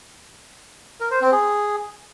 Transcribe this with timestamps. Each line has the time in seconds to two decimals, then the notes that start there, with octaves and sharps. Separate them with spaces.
1.00 A#4
1.11 C5
1.21 C4
1.32 G#4